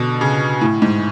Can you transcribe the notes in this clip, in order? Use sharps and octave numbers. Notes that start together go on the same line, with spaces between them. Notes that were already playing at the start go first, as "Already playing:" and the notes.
Already playing: B2 D3
C#3
A2
G#2